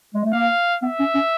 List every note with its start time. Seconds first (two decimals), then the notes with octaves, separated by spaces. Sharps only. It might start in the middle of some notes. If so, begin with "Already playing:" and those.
0.14 G#3
0.24 A3
0.33 A#3 F5
0.82 B3 E5
0.99 C#4
1.14 C#4